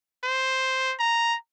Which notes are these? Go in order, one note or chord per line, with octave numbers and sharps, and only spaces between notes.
C5
A#5